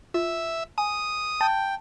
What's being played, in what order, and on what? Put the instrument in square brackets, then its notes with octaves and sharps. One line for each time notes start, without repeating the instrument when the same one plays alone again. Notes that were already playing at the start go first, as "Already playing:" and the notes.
[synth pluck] F4 [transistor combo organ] E5
[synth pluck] G#5 [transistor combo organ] D#6
[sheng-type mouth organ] G5 [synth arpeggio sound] A5